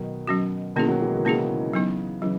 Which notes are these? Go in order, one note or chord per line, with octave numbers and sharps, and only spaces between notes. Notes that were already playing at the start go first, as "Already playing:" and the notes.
Already playing: B2 D#3 F#3
F#3 C#4 F#4
B2 D#3 A#3 C#4 E4 G#4
D#3 F#3
E3 G#3
D#3
C#3 E3 A#3 C#4 E4 G#4
F#3 B3 D#4
C#3 E3 F#3